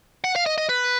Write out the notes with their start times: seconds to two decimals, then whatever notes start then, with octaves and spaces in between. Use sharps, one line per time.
0.24 F#5
0.36 F5
0.46 D#5
0.58 D#5
0.69 B4